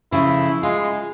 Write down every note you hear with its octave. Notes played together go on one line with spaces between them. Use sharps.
C#3 F3 A3 E4
G#3 F4